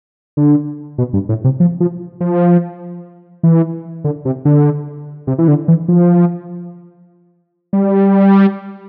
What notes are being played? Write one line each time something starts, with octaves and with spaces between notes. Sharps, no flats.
D3
B2
G2
A2
C3
F3
F3
F3
E3
D3
C3
D3
C3
E3
D3
E3
F3
G3